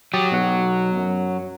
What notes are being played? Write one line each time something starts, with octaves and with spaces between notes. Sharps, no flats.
F#3 G4 D#6 A6
B1 B2 F#5
F#2